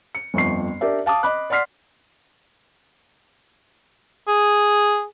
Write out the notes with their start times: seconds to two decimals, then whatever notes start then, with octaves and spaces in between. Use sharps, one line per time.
0.15 C#7
0.34 G1 F2 C#6 C7
0.81 D4 G4 A#4 D5 E5
1.06 F5 A5 D6 D#6
1.23 D#5 B5 D6 F#6
1.50 D5 F#5 C6 F6 B6 C7
4.28 G#4